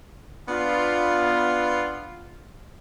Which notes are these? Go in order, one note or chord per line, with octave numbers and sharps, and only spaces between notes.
B3 D4 F4